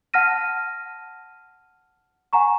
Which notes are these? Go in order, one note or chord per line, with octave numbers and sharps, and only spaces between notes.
F#5 A5 F6 A#6 D#7
F#5 G#5 A#5 C#6